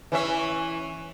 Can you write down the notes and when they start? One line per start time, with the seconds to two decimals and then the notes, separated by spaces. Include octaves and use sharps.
0.12 E3 C#4 E5